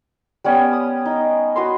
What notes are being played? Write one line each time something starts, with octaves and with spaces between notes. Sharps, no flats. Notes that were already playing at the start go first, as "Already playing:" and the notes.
G3 B3 C#4
D#6
D#4
F#4 B4 C6